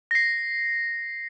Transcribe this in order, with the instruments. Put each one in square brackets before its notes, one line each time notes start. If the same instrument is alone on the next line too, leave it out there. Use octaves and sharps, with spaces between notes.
[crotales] A#6 C7